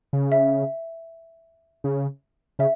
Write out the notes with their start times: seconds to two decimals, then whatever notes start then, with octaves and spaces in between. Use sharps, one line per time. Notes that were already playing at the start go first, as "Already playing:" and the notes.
0.13 C#3
0.32 E5
1.84 C#3
2.59 C#3 E5